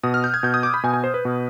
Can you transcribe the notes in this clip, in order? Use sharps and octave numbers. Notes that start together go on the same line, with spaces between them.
B2 D#6
F6
G6
G#6
B2 G6
D#6
D6
B5
B2 G#5
G#5
C5
B4
B2